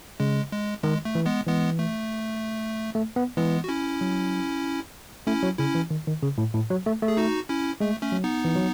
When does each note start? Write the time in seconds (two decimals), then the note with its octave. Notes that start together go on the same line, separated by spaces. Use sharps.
0.20 C#3 G#3
0.52 G#3
0.83 D#3 G#3
1.05 A3
1.15 E3
1.26 G#3 B3
1.47 E3 G#3 B3
1.79 A3
2.95 A3
3.16 B3
3.37 E3 G#3 B3
3.64 F#4
3.69 C#4 E4
4.01 F#3
5.27 A3 C#4 E4
5.43 F#3
5.59 C#3 C#4 E4
5.75 E3
5.91 D#3
6.07 D#3
6.22 C#3
6.38 A2
6.54 A2
6.70 F#3
6.86 A3
7.02 A3
7.08 G#4
7.17 D#4 F#4
7.49 C#4 E4
7.80 G#3 A3
8.02 A3 C#4
8.12 F#3
8.24 B3 D#4
8.45 E3
8.55 F#3